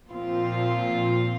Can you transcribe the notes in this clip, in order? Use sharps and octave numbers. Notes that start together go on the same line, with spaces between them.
A#2 F3 C4 F4